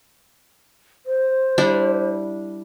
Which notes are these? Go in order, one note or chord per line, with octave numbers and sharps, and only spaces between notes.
C5
G3 D4 E4